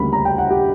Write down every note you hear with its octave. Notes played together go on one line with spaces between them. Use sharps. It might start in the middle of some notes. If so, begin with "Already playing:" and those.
Already playing: D2 C#3 G3 A#3 B5
A#5
G5
F#5
G4